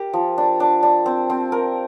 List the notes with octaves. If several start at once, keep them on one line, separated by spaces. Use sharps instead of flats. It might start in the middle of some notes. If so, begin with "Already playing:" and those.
Already playing: G4 A#4
F3
D4
D4
D4
C4
C4
A#4